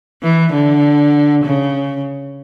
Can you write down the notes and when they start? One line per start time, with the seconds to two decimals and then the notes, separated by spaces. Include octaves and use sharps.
0.23 E3
0.53 D3
1.45 C#3